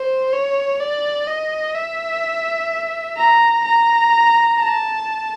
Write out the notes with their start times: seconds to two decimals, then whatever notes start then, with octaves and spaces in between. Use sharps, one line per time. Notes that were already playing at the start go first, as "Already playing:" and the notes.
Already playing: C5
0.32 C#5
0.80 D5
1.28 D#5
1.75 E5
3.18 A#5
3.65 A#5
4.60 A5